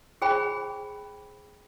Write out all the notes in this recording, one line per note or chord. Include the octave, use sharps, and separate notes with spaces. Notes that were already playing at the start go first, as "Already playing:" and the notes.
G#4 C5 G5 B5